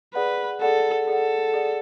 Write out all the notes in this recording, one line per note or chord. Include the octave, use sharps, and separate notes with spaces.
G#4 B4 D5 F#5
G#4 A4 D5 F#5
G#4 A4 D5 F#5
G#4 D5 F#5